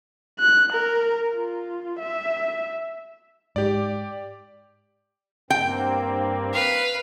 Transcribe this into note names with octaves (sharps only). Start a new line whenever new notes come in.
F#6
A#4
F4
E5
G#2 G4 D5
G2 A#3 C4 G5
B4 F5